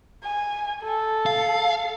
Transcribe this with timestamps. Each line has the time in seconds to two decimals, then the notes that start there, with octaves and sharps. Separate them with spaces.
0.24 G#5
0.83 A4
1.26 F5